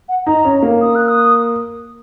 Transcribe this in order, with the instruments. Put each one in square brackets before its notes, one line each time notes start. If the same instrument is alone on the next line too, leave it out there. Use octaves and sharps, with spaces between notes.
[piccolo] F#5
[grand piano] D#4 [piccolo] A#5
[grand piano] C#4
A#3
[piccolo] D#6
F#6
D#6